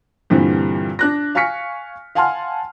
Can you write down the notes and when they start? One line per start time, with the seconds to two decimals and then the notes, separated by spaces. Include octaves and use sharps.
0.30 G2 A#2 D3 E3 G3 C4
0.99 D4 F#6 A#6
1.35 F5 G#5 C#6 F6 B6 C#7
2.15 F5 F#5 G#5 A5 C6 F6